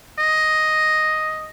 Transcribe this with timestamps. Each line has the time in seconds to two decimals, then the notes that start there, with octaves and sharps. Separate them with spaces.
0.19 D#5